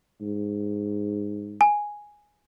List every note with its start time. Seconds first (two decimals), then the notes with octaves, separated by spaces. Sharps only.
0.21 G#2
1.61 G#5